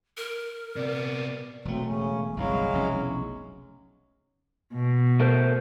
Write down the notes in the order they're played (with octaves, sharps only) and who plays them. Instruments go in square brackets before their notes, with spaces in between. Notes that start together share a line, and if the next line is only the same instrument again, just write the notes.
[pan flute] A#4
[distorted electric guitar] C3 B3 [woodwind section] D5
[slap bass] E1 A3 [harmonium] F#3 C4
[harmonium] C#3 C#4
[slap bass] G1 C2 A#2 [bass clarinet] F#3 [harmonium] G#3 E4 F5
[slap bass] F1 B1 C#4
[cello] B2
[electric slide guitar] A3 A#4 C5